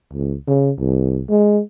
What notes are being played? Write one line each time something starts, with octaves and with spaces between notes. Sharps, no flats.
C#2
C#3
C2
G#3